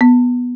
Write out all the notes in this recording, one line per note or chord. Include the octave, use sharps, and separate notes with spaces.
B3